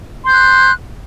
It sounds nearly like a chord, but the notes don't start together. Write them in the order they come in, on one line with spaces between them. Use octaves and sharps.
C6 G6 F#6